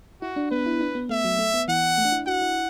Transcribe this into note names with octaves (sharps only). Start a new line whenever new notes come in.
E4 F#4
D4
B3 B4
E4
D4
B3
A3 E5
F#3
A3
B3
E3 F#5
A3
D4
E4
F#4 F#5
E4